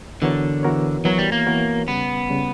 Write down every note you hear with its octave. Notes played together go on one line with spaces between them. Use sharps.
D3 E3 B3 F#4 A#4 C#5
E3 B3 F#4 A#4 C#5
E3 F#3 B3 F#4 A#4 C#5
G3
A#3
E3 B3 F#4 A#4 C#5
C#3 G3 B3 C#4
C#3 G3 C#4